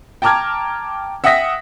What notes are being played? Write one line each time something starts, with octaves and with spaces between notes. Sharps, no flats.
G5 A5 A#5 D6 F6 G#6
E5 F#5 G5 D#6 A#6 B6